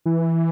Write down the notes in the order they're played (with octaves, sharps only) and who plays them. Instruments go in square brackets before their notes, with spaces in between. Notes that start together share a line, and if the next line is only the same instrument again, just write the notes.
[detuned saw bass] E3